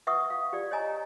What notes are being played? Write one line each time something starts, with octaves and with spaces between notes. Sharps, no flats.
B4 E5 F#5 C#6 D#6
F5
G4 D5
C#5 D#5 G#5 A#5